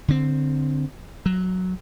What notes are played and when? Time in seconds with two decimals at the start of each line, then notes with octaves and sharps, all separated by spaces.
0.08 D3 C4
1.26 F#3